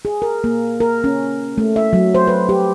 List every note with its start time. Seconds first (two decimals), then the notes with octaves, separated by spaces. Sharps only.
0.05 G#4
0.22 A#4
0.44 A#3
0.80 A#4
1.04 C#4
1.58 A3
1.76 E5
1.93 F#3
2.15 C5
2.27 B4
2.49 G4